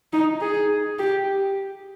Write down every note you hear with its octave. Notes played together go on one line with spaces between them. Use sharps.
D#4
G#4
G4